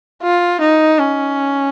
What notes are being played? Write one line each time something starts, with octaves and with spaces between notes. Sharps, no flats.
F4
D#4
C#4